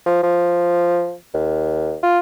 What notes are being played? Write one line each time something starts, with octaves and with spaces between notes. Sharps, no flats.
F3
F3
D#2
F4